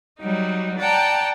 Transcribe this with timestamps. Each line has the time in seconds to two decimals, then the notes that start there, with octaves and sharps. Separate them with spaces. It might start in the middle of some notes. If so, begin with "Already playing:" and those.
0.19 F#3 G3 D#4
0.79 D5 F#5 G5 A5 A#5